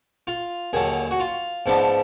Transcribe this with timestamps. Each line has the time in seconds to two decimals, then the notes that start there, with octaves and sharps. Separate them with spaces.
0.27 F4
0.73 D#2 D3 F#3 G#4
1.11 F#4
1.20 F4
1.66 G#2 F3 B3 D4